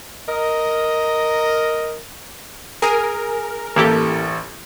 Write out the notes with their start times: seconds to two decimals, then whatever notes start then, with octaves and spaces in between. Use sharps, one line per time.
0.28 A#4 D#5
2.82 G#4 A#4 G#5
3.76 A1 A#3 E4 G4 A4